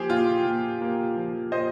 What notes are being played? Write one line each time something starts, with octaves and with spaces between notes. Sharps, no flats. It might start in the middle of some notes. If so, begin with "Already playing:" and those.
Already playing: F3 A#3 G4 G#4 C5
A#2 F4
A#2
A#3
F3
A#2 C5 D#5